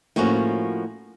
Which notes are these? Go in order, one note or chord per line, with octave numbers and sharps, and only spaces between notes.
A2 F3 A#3 C#4 F#4